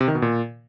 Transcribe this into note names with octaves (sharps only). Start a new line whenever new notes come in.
C3
D#3
B2
A#2